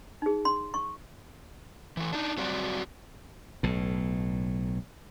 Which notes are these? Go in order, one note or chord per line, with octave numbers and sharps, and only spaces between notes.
D#4 G#4
C6
C#6
E3 A3
D4 D#4
F#3 G3 C4 F#4 D5
B1 A2